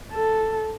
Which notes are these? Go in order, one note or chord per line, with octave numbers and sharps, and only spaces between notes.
A4